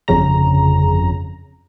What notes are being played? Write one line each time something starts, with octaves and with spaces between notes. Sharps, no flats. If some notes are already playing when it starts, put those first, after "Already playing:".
G1 F2 C#3 A#5